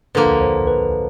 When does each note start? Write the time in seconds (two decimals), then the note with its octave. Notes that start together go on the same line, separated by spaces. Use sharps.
0.15 D3 F3 A#3 B4
0.41 C5
0.67 B4